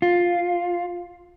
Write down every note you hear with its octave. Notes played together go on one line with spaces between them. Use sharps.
F4